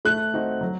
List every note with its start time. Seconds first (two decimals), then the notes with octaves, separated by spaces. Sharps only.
0.05 A3 F#6
0.34 C4 D#4 F#4
0.61 F#3